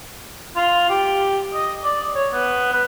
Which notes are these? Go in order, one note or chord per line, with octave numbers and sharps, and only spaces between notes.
F4
G4
D#5
D5
C#5
B3
B4